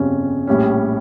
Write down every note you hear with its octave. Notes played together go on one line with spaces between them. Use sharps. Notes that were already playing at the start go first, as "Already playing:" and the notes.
Already playing: G1 F2 C#3 G3 C#4
A#1 A2 G3 C#4